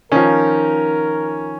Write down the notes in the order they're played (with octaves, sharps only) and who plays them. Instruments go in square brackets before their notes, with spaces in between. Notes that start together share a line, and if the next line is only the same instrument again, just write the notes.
[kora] D#3 F3 [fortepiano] C#4 [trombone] A#4